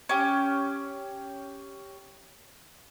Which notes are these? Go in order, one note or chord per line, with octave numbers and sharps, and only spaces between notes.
C#4 G4